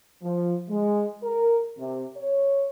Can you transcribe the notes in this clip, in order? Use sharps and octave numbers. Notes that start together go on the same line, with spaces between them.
F3
G#3
A#4
C3
C#5